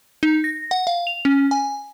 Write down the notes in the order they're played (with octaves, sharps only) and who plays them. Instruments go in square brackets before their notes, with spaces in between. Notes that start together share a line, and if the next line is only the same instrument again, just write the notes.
[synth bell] D#4
A#6
F#5
F5
F7
C#4
G#5